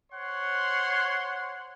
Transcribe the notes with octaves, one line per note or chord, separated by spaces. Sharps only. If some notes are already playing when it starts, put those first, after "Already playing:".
C5 C#5 F#5 C6